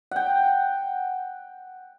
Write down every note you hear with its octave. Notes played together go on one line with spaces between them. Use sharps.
F#5 G5